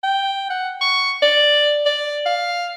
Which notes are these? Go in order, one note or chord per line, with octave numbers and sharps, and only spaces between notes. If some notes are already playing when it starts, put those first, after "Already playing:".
G5
F#5
C#6
D5
D5
F5